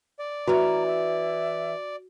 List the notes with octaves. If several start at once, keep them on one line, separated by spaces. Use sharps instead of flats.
D5
E3 C#4 F#4 A#5
E5